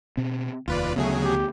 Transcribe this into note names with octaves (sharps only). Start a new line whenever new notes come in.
B2 C4
F1 D#2 F4 B4 D5
D2 C#3 F#3 A3 B3 G#4
G4